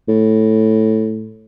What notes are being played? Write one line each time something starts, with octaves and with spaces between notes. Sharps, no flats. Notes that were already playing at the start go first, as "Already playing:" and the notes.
A2